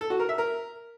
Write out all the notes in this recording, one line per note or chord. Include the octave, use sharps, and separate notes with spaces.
A4
F#4
A#4
E5
A#4